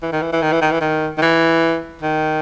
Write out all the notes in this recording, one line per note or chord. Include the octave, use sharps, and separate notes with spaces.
E3
D#3
E3
E3
D#3
E3
D#3
E3
D#3
D#3
E3
D#3